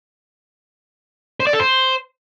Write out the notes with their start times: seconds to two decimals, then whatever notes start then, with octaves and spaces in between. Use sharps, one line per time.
1.40 C5
1.47 D5
1.53 A4
1.60 C5